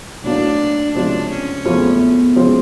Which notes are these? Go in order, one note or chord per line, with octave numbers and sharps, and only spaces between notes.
A2 F#3 A#3 D4 D#4 F#4
C#2 C3 F3 D4
C#4
E2 C#3 F3 A3 C4
C#3 F3 G#3 C4